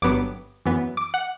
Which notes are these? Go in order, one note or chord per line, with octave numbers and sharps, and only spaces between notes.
G1 G2 F#3 B3 D6
F#2 E3 B3
D6
F#5